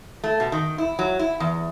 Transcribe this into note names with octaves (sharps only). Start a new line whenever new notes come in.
A3
B2
D#3
E4
F#3
E4
E2